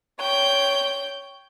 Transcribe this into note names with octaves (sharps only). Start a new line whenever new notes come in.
C#5 G5 G6